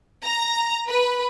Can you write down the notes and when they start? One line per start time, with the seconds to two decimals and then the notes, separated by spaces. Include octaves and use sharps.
0.24 A#5
0.88 B4